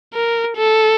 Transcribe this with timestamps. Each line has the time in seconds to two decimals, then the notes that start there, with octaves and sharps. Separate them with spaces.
0.14 A#4
0.57 A4